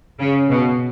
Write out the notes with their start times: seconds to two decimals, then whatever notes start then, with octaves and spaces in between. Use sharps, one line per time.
0.19 C#3
0.50 B2